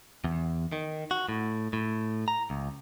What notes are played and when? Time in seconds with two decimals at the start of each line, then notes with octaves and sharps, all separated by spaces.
0.24 E2
0.72 D#3
1.11 F#4
1.29 A2
1.73 A2
2.28 A#5
2.50 C#2